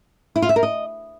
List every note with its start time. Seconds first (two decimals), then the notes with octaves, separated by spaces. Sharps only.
0.36 E4
0.42 F4
0.49 E5
0.56 A#4
0.63 D#5